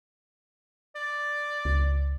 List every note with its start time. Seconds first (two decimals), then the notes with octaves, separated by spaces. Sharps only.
0.96 D5
1.65 C#2